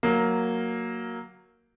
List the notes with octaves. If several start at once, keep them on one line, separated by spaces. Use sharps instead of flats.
F#3 A#3